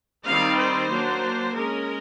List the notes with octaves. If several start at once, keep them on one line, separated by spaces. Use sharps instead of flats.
D#3 G3 C4 D#4 F5
C5
F#3 A#3 D4
G#3 C#4 A#4